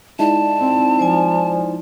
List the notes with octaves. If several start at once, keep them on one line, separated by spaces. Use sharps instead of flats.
G#3 D#4 E4 D5 A5
C4
F3 C5 D5 G#5